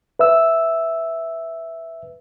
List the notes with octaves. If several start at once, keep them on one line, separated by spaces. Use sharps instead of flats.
B4 E5 E6